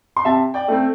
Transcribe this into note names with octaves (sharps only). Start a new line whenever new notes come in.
C6
C3 E5 A5
D5 G5
A3 C4